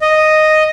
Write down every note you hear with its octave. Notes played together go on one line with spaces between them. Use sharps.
D#5